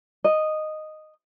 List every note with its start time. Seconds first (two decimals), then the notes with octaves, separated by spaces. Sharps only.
0.24 D#5